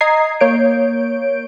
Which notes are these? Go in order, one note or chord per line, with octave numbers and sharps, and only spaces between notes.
D#5 A#5 D#6 G#6 C7
A#3 C#5 G6 D7